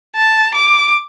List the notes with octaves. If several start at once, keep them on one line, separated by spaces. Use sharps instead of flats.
A5
D6